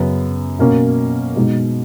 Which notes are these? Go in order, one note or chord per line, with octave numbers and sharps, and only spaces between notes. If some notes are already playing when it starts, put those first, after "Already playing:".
Already playing: F#2 C#3 F#3 B3
B2 A#3 C#4
B2 G#3 D#4